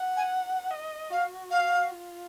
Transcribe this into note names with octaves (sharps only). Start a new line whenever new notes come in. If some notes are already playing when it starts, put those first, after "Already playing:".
Already playing: F#5
G#5
D#5
F#4 F5
F5
F4